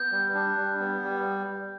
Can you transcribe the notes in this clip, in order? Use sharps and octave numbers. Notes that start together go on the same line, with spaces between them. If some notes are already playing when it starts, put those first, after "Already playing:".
Already playing: B3 G6
G3
D4
G3
B3
G3